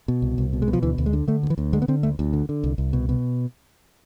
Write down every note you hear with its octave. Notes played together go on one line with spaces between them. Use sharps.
B2
C2
C2
B2
G#3
B2
F3
D2 E3
D2
G#3
D3
D3 A3
D2
E3
D2
D3 G#3
B3
D3 C4
D2 A3
D2
D3
D3
C2
C2
B2
B2